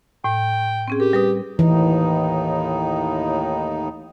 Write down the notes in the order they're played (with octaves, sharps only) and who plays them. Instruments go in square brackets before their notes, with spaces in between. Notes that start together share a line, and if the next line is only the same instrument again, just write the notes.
[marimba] A2 [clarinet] G5
[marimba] C4 C#4 G#4
[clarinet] G4 [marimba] A#4
[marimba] G3 B4 D#6
[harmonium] D#2 A2 D#4 [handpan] E3